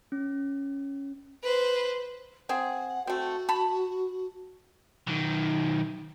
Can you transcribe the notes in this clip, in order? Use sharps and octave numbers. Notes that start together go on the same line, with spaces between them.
C#4
B4 C5
C4 G#4 F#5
A3 C4 F#4
A5 B5
B1 D#3